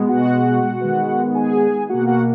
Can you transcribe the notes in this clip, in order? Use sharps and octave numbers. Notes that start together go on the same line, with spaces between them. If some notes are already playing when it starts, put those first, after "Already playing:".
Already playing: B2 G#3 B3
F#4 F#5
D#3 G#3 B3
G#4 G#5
B2 A#3 F#4 F#5
F#4 F#5